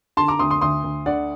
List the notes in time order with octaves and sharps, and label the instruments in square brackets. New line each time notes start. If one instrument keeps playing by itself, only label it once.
[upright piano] D3 A5 C6
A#5 D6
D2 C6 D#6
C6 D#6
D2 C6 D#6
D2
D3 D5 F#5